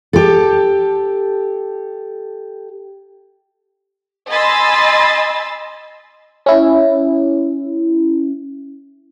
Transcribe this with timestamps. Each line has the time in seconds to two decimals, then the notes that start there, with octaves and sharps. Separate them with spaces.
0.13 G4 A4
4.31 D#5 G#5 B5 C6 E6 A6
6.46 C#4 E4